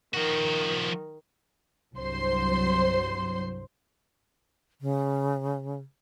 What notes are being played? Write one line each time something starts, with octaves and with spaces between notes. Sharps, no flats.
D#3 F3 F#4
C2 G2 F#3 C5 C6
C#3